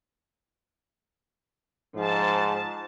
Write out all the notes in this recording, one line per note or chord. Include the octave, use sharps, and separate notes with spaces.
G#2 F3 A5